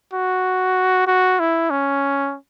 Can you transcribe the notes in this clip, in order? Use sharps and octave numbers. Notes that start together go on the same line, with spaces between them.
F#4
F#4
E4
C#4